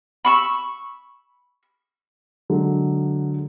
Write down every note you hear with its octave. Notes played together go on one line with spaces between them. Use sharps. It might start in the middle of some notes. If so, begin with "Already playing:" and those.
B5 C#6 E6
D3 F#3 G#3